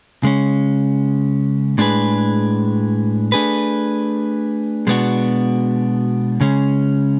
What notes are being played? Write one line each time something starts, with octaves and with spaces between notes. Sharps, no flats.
C#3 G#3 C#4
A2 G#3 D4 G#4 B4
A3 D4 G#4 B4
B2 G#3 B3 D4 F#4
C#3 G#3 C#4